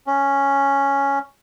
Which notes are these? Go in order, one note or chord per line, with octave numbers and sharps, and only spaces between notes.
C#4